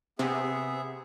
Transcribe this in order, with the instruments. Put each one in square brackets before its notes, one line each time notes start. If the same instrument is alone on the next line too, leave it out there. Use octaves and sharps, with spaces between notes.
[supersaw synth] C3 [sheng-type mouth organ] B3 G#4 E5